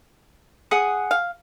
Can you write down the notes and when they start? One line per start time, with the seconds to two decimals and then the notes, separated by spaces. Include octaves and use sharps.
0.71 G#4 F#5 D#6
1.11 F5